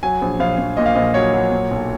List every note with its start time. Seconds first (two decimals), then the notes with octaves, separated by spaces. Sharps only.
0.03 F#3 G#5
0.22 A#1
0.39 A#1 F5
0.58 A#1
0.77 A#2 D#5
0.86 F5
0.95 A#1 D#5
1.14 F#3 C#5
1.34 F#3
1.52 A#2
1.71 B1